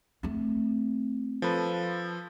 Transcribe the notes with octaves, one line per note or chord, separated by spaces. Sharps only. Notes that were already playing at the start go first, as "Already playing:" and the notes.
A3 C4
F3 A4 B4